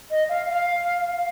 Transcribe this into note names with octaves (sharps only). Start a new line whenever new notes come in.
D#5
F5
F5